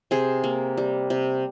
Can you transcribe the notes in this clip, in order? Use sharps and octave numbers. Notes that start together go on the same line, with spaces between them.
C3 G#4 C5
A#3
G3
C3